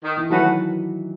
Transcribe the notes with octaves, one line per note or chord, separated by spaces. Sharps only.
D#3
E3
D#3 F#3 A3 C#4 F#4 B4